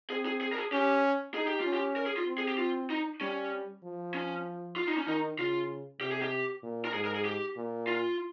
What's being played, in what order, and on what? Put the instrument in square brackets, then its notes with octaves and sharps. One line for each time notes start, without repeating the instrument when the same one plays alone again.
[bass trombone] C4 [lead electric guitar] G#4
[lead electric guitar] G#4
G#4
A#4
G#4
[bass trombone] C#4 [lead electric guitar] G4
[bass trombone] D#4 [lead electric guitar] G#4
[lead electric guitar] G4
[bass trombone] C#4 [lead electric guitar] F4
[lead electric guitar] G4
A#4
G#4
F4
[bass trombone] C4
[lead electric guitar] G#4
G4
F4
D#4
[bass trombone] G3 [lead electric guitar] C#4
[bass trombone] F3
[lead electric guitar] C#4
F4
D#4
C#4
[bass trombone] D#3 [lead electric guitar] D#4
[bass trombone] C#3 [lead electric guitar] F4
[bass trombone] C3 [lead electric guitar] G4
[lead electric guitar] G#4
G4
[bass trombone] A#2
[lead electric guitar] A#4
[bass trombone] G#2 [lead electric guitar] G#4
[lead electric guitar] A#4
G#4
G4
[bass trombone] A#2
[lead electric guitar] F4